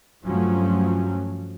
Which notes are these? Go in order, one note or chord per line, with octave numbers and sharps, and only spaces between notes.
G2 F3 F#3 A3 C#4